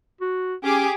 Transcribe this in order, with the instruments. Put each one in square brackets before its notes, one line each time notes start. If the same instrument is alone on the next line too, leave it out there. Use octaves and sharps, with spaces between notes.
[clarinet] F#4
[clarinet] C#4 [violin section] G4 G#4 D6